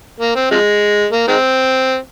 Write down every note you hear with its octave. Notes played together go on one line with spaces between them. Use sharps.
A#3
C4
C3 F3 G#3
A#3
D#3 G#3 C4